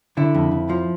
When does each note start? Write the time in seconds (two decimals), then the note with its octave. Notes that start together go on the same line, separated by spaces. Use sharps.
0.17 D3 E4
0.35 F2
0.51 F2
0.69 F3